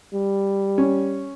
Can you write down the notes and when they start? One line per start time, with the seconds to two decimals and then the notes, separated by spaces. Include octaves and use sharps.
0.14 G3
0.78 C#4